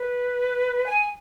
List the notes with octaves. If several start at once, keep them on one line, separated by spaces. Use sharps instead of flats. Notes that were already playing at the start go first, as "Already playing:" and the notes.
Already playing: B4
G#5